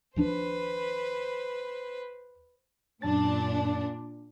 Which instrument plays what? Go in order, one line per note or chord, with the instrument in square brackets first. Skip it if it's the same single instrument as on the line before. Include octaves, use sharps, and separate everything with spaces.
[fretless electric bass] D#2 F3 D4 [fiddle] B4 C5
[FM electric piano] F#2 A5 A6 [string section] A#2 D4